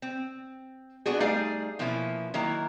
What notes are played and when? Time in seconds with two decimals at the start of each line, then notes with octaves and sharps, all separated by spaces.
0.02 C4
1.06 B3 D4 F#4 G#4
1.20 G3 A3 D#4 G#4 D5 F5
1.79 B2 F3 A#3 C#4 E4
2.34 D#3 F#3 A#3 E4 A#5